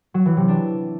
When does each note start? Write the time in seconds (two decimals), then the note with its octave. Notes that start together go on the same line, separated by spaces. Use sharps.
0.14 F#3
0.26 E3
0.37 C3
0.48 D4